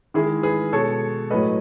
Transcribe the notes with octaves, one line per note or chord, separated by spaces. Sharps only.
D#3 G#3 E4 G#4
G#4 B4
B2 G#3 A4 C#5
A2 F#3 A3 B4 D#5